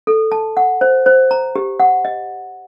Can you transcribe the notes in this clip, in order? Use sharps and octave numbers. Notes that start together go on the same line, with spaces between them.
A4
A5
F#5
C5
C5
A#5
G4
F#5
D#5